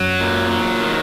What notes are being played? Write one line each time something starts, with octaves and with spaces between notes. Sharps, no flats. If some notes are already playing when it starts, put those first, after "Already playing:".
Already playing: F#2 F#3
A#2
F#3
D#3